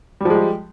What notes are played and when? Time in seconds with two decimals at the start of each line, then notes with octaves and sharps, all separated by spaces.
0.21 G3
0.25 F3
0.30 G#3
0.35 G4